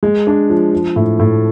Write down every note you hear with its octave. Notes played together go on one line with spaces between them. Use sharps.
G#3
D4
F3
F3
A2
A2